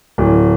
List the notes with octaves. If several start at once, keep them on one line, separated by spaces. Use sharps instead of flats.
D1